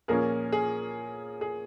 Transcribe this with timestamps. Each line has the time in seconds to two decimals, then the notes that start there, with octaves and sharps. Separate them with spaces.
0.08 A#2 F3 A#3 C#4 G#4 A#4
0.52 G#4
1.41 G#4